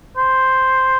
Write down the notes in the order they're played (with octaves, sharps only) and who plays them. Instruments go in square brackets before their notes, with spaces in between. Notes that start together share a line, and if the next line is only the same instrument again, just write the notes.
[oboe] C5